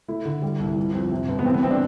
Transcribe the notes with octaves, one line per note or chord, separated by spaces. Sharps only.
A3 E4
D3
G3
C2
G1
F2
C3
G1
B3
E3 C4
B3
C4
D4